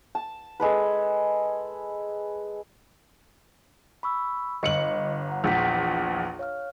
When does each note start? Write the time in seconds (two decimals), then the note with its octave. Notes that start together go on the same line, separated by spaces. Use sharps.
0.15 A5
0.60 G#3 A4 B4
4.03 B5 C#6 E6
4.63 G1 D#5 C#7 F#7
5.29 F#5 A#5
5.44 A#1 E2 G6 B6
6.39 C#5 F5 F6